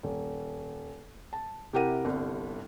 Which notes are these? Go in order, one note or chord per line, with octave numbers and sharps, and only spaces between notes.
D#1
A5
C3 E4 G4 A#4 F#5 D#7
G1 C2